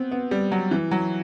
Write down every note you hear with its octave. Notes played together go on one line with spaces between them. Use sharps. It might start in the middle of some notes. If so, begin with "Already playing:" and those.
Already playing: B3 C4
B3
G3
F#3
E3
F#3